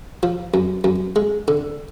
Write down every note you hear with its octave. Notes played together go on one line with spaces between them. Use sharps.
F3
F#2
F#2
G#3
D3